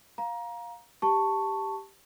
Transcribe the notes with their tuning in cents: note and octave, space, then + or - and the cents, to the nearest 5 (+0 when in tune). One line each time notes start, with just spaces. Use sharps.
F5 +10 A#5 +20
G4 +0 A5 +10 C#6 +0